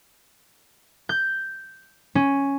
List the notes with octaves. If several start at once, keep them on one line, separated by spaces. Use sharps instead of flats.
G6
C#4